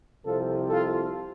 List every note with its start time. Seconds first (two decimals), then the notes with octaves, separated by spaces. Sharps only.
0.24 C2 C3 F3 F4 A4
0.69 F4 A4